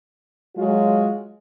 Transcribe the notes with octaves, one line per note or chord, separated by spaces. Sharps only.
F#3 G#3 F4 F#4